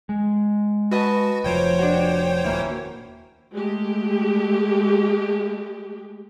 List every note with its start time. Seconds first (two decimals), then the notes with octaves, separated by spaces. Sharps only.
0.09 G#3
0.91 F#4 B4 D#5 A5
1.44 F1 F3 C5 C#5 G5
1.79 D4 F#4
2.44 D#1 D#2 E3 A#3 C#4
3.53 G#3 A3 G4